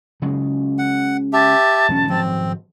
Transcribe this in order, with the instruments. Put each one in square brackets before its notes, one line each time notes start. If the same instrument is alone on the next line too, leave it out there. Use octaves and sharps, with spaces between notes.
[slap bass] C#3 F#3 G#3
[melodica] F#5
[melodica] G4 E5 [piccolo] A5
[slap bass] E1 F#3 C#4
[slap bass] G#1 F3 F#3 [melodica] C4